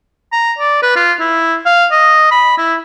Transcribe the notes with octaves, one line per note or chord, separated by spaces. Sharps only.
A#5
D5
B4
F4
E4
F5
D#5
B5
E4